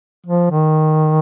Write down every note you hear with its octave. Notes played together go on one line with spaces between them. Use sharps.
F3
D#3